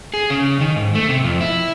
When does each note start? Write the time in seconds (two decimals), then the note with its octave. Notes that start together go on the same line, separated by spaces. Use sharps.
0.14 G#4
0.30 C#3
0.60 D#3
0.76 G#2
0.95 A3
1.09 C3
1.24 F2
1.41 E4